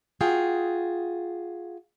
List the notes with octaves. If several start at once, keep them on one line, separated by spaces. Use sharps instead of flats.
F4 F#4 G#4 G5